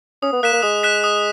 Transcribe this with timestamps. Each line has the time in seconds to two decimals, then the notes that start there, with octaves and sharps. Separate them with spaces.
0.22 C#4 D#6
0.33 B3
0.43 A#3 F#6 B6 E7
0.53 A#3
0.62 G#3 D#6
0.83 F#6 B6 E7
1.04 D#6